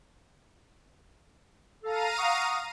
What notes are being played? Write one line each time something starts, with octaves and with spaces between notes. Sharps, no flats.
A4 F5 A#5 D#7
F#5 C#6 D#6